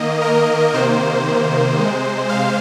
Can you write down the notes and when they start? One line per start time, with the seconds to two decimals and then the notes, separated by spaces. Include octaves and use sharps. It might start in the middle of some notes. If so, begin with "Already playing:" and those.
Already playing: D#3 A#3 D#5
0.21 A#4
0.73 C3 D#3 A#3 C5
1.78 C3 G#3
2.29 F5